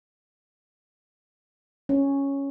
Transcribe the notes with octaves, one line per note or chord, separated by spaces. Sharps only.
C#4